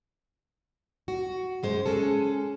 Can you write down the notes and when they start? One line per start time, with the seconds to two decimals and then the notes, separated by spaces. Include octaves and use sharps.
1.08 F#4
1.63 F#2 G#3 C5
1.86 G#3 C#4 G#4 A4